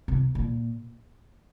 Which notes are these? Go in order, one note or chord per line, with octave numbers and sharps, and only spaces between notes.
C3
A#2